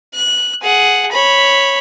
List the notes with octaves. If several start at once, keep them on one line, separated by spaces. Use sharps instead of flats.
F#6
G#4 F#5
C#5 B5